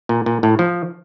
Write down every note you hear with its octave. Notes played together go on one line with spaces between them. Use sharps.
A#2
A#2
A2
F3